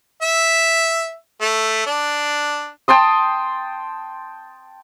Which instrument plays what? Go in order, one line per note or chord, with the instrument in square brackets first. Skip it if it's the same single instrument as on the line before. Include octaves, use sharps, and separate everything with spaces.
[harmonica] E5
A3
D4
[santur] G5 A5 C6 D#6